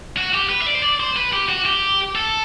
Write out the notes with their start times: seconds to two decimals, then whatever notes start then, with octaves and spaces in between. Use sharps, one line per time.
0.17 F#4
0.34 G4
0.50 B4
0.60 E5
0.66 D5
0.75 C5
0.83 D5
1.00 C5
1.16 B4
1.33 G4
1.49 F#4
1.65 G4
2.15 A4